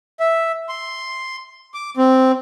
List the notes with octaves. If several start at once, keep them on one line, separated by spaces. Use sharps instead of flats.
E5
C6
D6
C4